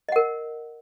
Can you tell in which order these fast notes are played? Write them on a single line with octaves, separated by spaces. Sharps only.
D#5 F#5 A#4